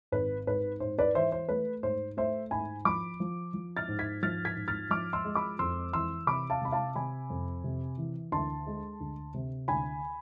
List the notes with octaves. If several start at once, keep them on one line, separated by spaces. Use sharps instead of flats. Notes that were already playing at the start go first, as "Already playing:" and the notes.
G#1 B4
G#2 B4
G#2 C5
B4 D5
E3 C5 E5
C5
A3 B4
G#2 C5
A3 C5 E5
G#2 G#5 B5
F3 B5 D6
F3
F3
F6 A6
G#2
G#6 B6
F3 F6 A6
G#6 B6
G#2
F6 A6
F3 D6 F6
C6 E6
G#3
B5 D6
F2 C6 E6
E3 C6 E6
C3 B5 D6
F5 A5
C3 B5
F5 A5
C3 G#5 B5
F2
C3
E3
D2 A5 C6
G#3
D2
C3
D2 G#5 B5